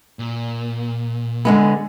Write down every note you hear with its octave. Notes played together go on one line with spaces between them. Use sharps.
A#2
D3 G#3 B3